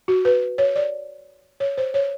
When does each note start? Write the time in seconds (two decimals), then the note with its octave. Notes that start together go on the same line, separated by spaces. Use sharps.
0.08 F#4
0.25 B4
0.58 C#5
0.76 D5
1.60 C#5
1.78 C5
1.94 C#5